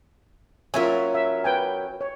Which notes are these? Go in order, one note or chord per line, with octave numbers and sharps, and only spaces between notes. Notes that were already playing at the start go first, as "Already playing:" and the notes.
F#3 C#4 F4 A#4 E5 G#5
E5
B4 G5 G#5
C#5